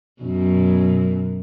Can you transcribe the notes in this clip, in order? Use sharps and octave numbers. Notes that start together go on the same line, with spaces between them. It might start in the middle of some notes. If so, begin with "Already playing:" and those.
F#2 B2